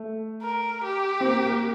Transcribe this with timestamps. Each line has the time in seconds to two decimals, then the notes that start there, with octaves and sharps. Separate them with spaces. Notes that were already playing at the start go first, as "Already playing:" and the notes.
Already playing: A3
0.42 A#4
0.84 G4
1.21 C4
1.25 A#3
1.46 A#3